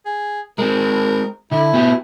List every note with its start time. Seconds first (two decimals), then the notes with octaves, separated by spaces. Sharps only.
0.06 G#4
0.58 G#3 C4 A#4
1.51 D3 E4
1.74 B3 F#4 G4